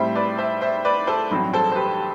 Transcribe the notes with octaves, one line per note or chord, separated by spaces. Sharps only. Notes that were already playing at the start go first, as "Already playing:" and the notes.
Already playing: A2 G3 C4 C5 E5
B4 D5
C5 E5
C5 E5
B4 D5
A4 C5
A1 G2 F#3 C4
A4 C5
C5
G4 B4